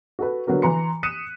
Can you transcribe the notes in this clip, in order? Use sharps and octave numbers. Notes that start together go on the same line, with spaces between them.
F#4 A4 B4
D3 F#3 B3 F#4 A#4
E3 A#5 C6 C#7
D#6 F#6 B6 C#7 D#7 E7